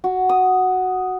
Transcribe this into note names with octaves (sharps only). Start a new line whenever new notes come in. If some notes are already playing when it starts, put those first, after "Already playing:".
F#4
D#6